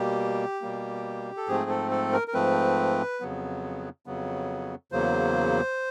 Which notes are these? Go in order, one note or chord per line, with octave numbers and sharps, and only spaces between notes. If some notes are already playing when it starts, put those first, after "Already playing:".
Already playing: B2 G3 A#3 G4
B2 G3 A#3
A4
G#2 F3 A3 C4 G#4
A4
A4
A#4
A#4
G#2 F3 A3 C4 B4
F2 C#3 F#3 B3
F2 C#3 F#3 B3
E2 C#3 F#3 A#3 C5